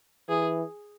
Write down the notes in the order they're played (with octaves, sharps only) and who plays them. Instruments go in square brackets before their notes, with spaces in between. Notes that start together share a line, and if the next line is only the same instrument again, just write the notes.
[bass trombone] E3 [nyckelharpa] G#4